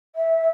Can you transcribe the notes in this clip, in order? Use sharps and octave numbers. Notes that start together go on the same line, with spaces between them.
E5